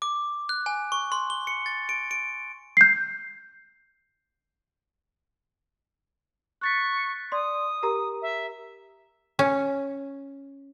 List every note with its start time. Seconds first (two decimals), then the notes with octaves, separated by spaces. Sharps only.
0.02 D6
0.49 F#6
0.66 G#5
0.92 C#6
1.12 C6
1.30 G7
1.47 C#7
1.66 A6
1.89 D7
2.11 D7
2.77 G6 C7
6.61 C#6 F#6 A6 B6
7.32 D5 C6 D#6
7.83 G4 A#4 A#5
8.22 E5
9.39 C#4